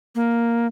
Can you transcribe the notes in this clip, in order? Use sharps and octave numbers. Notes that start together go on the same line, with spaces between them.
A#3